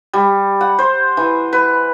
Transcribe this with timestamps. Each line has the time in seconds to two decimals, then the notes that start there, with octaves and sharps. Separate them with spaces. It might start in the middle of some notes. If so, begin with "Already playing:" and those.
0.13 G3
0.61 F#5
0.79 C5
1.17 E3
1.53 B4